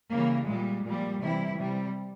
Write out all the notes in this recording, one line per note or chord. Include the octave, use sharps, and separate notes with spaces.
C#3 E3 G3 A#3
A#2 G3 G#3
A#2 F3 G3
C3 E3 G3 E4
C3 G3